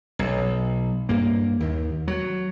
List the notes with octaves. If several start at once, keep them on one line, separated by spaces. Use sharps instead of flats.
B1
G2 A#3
D#2
F#3